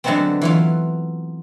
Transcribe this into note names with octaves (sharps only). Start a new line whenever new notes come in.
D3 F#3 G#3 A3 B3 C4
E3 F#3 F4